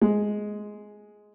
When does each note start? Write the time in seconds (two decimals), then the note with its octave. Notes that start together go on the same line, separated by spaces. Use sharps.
0.01 G#3